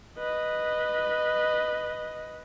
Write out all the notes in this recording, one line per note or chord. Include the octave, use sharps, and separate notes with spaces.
B4 D#5